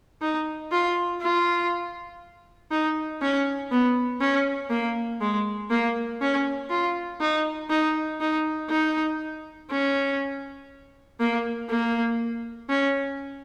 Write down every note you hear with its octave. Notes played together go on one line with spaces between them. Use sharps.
D#4
F4
F4
D#4
C#4
B3
C#4
A#3
G#3
A#3
C#4
F4
D#4
D#4
D#4
D#4
C#4
A#3
A#3
C#4